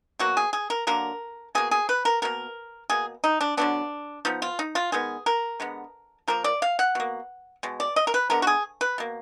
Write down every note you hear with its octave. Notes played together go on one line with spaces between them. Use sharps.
B2 F#3 A#3 F#4
G#4
G#4
A#4
D3 F#3 A#3 A#4
B2 A#3 G#4
G#4
B4
A#4
B2 A#3 A#4
B2 A#3 G#4
D#4
D4
D3 F#3 B3 D4
F3 B3 D#4
F4
D#4
F4
D#3 G#3 B3 G#4
A#4
D3 G#3 B3
F3 A#3 A#4
D5
F5
F#5
B2 A#3
B2 G#3
D5
D#5
A#4
B4
D3 G#3 B3 A#4
F#4
G#4
B4
B2 A#3